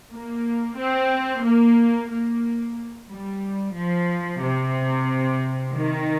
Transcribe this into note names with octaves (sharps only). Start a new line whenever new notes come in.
A#3
C4
A#3
A#3
G3
F3
C3
D#3